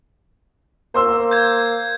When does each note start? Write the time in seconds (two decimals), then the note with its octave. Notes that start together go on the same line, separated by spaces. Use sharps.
0.94 A#3 C5 C6 E6
1.31 G6 G#6